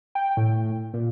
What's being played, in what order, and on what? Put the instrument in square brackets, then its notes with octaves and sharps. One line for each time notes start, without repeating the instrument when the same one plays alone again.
[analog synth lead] G5
A2
A#2